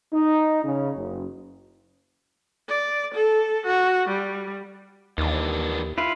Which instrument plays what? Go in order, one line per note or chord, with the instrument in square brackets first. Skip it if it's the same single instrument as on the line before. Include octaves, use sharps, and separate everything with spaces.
[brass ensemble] D#4
C#3
F#1
[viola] D5
A4
F#4
G3
[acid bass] D#2 [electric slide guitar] D#3 E3 D4
[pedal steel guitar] E4 F4 B4